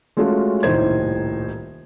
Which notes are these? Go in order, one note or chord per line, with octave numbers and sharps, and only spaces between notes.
G#3 A3 C#4 F4 F#4 A4
D#1 C2 A2 D#4 C5 G#6